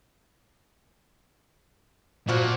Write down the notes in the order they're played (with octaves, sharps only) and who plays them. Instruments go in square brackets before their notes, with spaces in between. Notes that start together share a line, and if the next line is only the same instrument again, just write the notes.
[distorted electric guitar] A#2 [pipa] F3 F#4